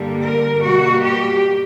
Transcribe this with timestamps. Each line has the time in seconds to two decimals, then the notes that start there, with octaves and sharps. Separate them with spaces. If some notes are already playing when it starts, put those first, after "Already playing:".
Already playing: G2 D3 G3 A#3
0.21 A#4
0.61 B2 G3 A#3 F#4
1.01 G4